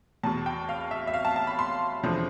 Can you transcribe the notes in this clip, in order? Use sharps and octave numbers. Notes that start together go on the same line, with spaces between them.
E2 B2 A5
G5
F5
E5
E5
F5
A5
A5
B5
C6
E2 D3 F3